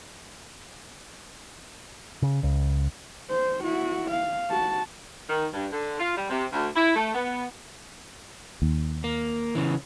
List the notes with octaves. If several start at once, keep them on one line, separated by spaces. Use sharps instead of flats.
C#3
C#2
C5
E4 F#4
F5
F#4 A5
D#3
G2
D3
F4
G3
C3
D2
E4
A3
B3
D#2
A#3
C#3 E3